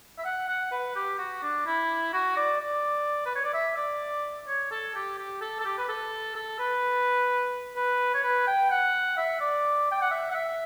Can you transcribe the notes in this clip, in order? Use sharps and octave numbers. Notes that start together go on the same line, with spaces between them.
E5
F#5
F#5
B4
G4
F#4
D4
E4
F#4
D5
D5
B4
C#5
D5
E5
D5
C#5
A4
G4
G4
A4
A4
G4
B4
A4
A4
B4
B4
C#5
B4
G5
F#5
E5
D5
G5
F#5
E5
F#5
E5